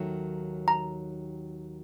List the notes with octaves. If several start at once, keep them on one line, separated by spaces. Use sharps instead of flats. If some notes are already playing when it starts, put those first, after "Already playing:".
Already playing: D#2 D#3 F#3 A3
A#5